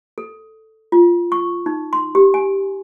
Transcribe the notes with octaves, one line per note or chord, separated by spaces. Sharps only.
A4
F4
C#6
D#4
C6
G4
G#5